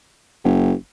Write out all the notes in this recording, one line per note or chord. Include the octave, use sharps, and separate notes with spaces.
F#1